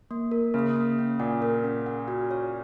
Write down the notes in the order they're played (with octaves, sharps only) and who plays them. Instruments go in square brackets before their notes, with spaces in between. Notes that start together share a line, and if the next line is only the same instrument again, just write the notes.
[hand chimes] A#3
A#4
[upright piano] C#3 [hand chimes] A#3
[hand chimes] A#3
C#4
[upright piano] A#2 [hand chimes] F#5
[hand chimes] A#4
C#4
F#5
F#4
C#5